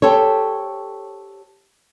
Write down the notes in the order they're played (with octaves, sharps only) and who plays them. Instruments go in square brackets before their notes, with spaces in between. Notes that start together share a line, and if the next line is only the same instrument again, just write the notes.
[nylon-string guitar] G4 A4 C5 C#5